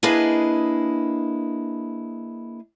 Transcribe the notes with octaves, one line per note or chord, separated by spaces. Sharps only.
A#3 D4 E4 G#4 B4 D#5